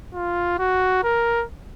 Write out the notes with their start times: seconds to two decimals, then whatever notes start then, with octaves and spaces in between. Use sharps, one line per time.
0.14 F4
0.59 F#4
1.04 A#4